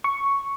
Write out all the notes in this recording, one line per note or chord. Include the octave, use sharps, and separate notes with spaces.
C#6